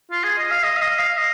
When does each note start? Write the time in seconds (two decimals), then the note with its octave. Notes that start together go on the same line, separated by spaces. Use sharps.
0.11 F4
0.24 G#4
0.38 D#5
0.51 F5
0.64 D#5
0.77 F5
0.81 D#5
0.99 F5
1.18 D#5